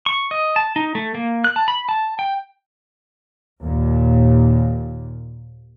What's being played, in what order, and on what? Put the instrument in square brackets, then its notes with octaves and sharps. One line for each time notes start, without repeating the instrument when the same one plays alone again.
[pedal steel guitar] C#6
D#5
A5
D#4
A3
A#3
F#6
A5
B5
A5
G5
[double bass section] D#2 A#2